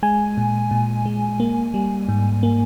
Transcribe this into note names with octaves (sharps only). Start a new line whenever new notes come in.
G#3 G#5
A#2
A#2
G#3
A#3
G3
G#2
A#3